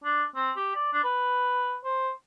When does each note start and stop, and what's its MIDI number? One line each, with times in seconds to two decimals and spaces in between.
0.04 0.24 62
0.35 0.51 60
0.56 0.70 67
0.75 0.91 74
0.93 1.03 62
1.04 1.76 71
1.84 2.09 72